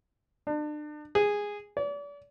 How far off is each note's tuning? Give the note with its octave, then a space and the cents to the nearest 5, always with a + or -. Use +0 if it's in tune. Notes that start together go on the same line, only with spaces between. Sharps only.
D4 +35
G#4 -10
D5 -40